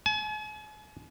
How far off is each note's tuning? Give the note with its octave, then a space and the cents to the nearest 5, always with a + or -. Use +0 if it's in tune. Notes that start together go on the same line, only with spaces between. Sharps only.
G#5 +45